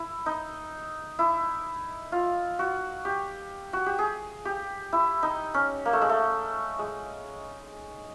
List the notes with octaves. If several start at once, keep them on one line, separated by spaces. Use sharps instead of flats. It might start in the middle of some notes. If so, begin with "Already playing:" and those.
Already playing: E4
D#4
E4
F4
F#4
G4
F#4
G4
G#4
G4
E4
D#4
C#4
A#3
A3
G#3
A3
G#3